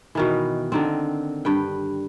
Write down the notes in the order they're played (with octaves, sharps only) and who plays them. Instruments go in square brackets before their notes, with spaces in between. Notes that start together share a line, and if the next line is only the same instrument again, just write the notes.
[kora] B2 D#3 E3
D3 D#3 C4
G2 B4 G5